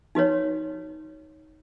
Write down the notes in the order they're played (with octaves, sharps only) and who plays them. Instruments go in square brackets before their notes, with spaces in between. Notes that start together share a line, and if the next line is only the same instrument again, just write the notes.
[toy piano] D#4 F#4 B4 C#5